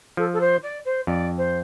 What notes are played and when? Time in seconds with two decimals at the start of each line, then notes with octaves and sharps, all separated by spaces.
0.17 F3 A4
0.32 A4
0.40 C5
0.62 D5
0.85 C5
1.06 F2 D5
1.37 C5